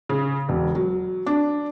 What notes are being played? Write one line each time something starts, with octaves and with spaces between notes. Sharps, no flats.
C#3
E1
F#3
D4